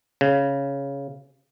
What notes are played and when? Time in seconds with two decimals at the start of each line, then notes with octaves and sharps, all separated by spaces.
0.21 C#3